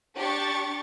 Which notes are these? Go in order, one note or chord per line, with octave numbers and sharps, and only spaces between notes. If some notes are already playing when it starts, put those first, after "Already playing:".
D4 G4 C#6 A6